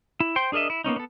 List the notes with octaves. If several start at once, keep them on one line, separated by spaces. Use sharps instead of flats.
E4
C5 G5 C6
D4 G#4 A#4 D#5 E5
E4
A#3 B3 C#4 D#4
B3 A4